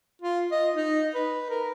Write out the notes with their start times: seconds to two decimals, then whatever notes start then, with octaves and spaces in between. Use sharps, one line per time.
0.22 F4
0.52 D#5
0.76 D#4
1.15 B4
1.50 A#4